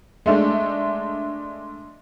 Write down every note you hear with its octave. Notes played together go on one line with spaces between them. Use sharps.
G#3 A3 D4